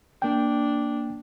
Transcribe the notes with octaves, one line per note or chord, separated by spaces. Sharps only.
A#3 D4 G5